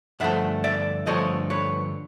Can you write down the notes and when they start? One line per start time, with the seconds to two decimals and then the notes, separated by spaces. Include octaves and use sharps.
0.20 G2 D3 F3 A3 E5 F#5
0.64 D5 E5
1.06 G2 D3 F3 A3 C#5 D#5
1.50 B4 C#5